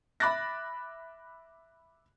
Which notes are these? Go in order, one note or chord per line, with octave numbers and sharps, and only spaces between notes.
E5 B5 D6 F#6 A6 A#6